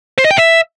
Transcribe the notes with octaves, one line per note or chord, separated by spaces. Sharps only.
C5
D#5
G5
E5